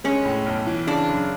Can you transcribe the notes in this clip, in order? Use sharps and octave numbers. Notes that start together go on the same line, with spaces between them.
G#3 C#4
A2
B1
E3
C#3 D4
F#2